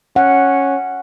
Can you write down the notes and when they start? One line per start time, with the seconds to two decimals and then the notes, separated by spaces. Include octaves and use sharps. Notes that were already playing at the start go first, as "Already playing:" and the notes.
0.16 C#4 F#5